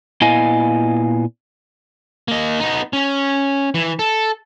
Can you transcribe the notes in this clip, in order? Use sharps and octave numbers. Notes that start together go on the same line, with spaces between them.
A#2 B3 E4 D#5 F5 G#5
A#3 D#5
B3 D#4
C#4
E3
A4